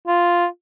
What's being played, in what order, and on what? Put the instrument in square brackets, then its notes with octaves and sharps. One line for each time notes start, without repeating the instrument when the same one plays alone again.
[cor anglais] F4